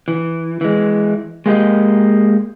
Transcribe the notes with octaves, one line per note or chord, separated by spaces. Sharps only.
E3
E3 G#3
G#3 A#3 G4 D#5